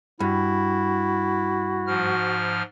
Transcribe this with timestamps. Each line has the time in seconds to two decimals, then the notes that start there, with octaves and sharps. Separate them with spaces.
0.20 G2 E4 F#4
1.86 G#2 F3 F6